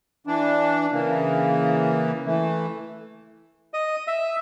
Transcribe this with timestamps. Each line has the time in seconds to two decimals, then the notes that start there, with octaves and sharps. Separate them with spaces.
0.27 E3 D4
0.92 C#3 E3 A#3
2.26 E3 A3
3.74 D#5
4.07 E5